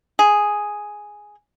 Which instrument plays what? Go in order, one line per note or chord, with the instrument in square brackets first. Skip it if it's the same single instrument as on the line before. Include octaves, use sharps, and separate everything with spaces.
[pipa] G#4